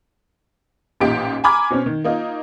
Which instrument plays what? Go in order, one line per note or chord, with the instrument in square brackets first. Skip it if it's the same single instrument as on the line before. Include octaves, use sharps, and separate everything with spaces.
[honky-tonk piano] A1 A#2 D#4 G4 D7
G#5 A#5 B5 D6 F6 G#6
B2 C4 C#4
D#3
A#3 D#4 F4